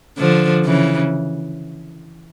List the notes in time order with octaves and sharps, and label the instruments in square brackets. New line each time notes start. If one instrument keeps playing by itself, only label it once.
[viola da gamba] D3 F3
C#3 E3